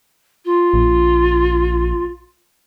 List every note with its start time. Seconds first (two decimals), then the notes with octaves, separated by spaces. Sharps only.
0.45 F4
0.73 A#1